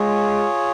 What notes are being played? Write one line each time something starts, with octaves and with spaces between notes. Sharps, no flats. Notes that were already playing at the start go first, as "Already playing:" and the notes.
Already playing: G#3 F4 G#4 C#5